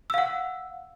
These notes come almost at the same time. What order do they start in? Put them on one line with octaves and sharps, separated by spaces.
E6 F5 F#5